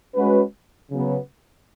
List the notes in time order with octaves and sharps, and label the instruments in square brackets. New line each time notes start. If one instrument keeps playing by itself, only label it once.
[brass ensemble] G#3 C#4 F#4 B4
C#3 F#3 B3